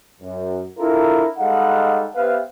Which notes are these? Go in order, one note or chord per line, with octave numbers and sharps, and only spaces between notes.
F#2
D4 E4 F4 A4 A#4
G3 G#3 D#4 A4 F5 F#5
B3 G4 B4 C5 E5 F5